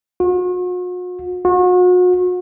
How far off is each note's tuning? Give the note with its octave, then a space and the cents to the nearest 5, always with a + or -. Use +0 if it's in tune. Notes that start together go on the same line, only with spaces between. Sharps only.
F#4 -45
F#4 -40